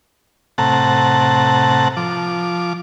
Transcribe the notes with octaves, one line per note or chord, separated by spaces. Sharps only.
A2 C3 F#5 A5 A#5
F3 D6